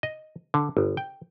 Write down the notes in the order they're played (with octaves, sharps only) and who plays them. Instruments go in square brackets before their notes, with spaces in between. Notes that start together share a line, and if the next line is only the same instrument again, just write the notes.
[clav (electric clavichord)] D#5
D3
G1
G5